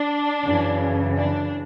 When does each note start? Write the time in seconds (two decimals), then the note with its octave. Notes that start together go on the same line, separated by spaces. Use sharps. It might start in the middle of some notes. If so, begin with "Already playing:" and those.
Already playing: D4
0.45 F#2 C#3 E3
1.17 D4